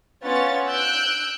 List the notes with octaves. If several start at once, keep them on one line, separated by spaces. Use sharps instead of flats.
B3 C#4 F4 C#5 A6
E6 F#6 G6 D7